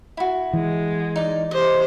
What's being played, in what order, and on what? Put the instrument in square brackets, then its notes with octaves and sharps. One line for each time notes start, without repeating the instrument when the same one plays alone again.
[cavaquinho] E4 F#4
[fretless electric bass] E3 [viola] G#3
[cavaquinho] D#4 D5
[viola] G4 C5 [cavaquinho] D#5